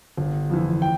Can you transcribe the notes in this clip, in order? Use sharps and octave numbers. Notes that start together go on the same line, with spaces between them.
G1
F2 E3
G5